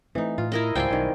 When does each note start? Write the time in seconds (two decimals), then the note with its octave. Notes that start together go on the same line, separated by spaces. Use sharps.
0.15 E3 A3 C4 D#4
0.38 A2 F4
0.52 E4 A#4 D#5
0.75 C#2 G#2 G3 C4 F4 G5 G#5 C6
0.91 B1 D#3 G3